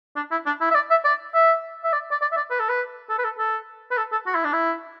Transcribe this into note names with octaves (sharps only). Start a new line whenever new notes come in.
D4
E4
D4
E4
E5
D5
E5
D5
E5
E5
D5
D5
D5
E5
D5
B4
A4
B4
A4
B4
A4
A4
B4
A4
A4
F#4
E4
D4
E4